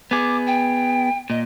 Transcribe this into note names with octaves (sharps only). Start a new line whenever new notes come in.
B3 G#4 D6
G5
A#2 D#5